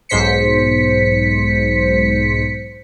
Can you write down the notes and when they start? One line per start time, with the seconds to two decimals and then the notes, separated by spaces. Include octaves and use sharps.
0.09 B1 G#2 C5 B6 C#7